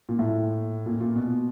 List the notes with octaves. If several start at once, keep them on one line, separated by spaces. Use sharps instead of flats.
A#2
A2
A#2
A#2
B2